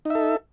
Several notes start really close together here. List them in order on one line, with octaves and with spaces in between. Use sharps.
D#4 E5 A4